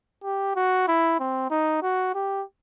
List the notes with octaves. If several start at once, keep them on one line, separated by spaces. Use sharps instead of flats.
G4
F#4
E4
C4
D#4
F#4
G4